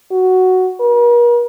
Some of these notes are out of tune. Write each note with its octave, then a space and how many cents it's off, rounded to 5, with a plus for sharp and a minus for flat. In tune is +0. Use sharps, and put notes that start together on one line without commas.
F#4 +5
A#4 +45